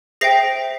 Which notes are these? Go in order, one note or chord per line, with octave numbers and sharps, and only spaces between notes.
G#4 C5 E5 G5 A#6 C7